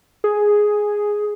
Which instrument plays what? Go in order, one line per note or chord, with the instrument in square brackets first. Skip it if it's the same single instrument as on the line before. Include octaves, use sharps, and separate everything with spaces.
[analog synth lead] G#4